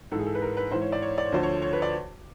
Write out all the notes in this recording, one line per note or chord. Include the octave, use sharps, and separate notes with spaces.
G#2 E3 G#4 A4
A4
B4
A#4
B4
G#2 E3 C5
C#5
D5
C#5
D5
C#5
D2 D3 F3 C5
C#5
C#5
B4
D5